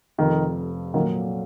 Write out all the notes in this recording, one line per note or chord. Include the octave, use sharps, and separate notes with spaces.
F1 F2 C3 D#3 F3
A#2 D#3 F#3 A#3